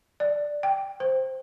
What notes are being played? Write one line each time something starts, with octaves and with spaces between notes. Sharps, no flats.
D5
G5
C5